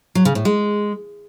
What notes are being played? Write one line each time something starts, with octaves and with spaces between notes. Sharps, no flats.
F#3
C#3
A2
G#3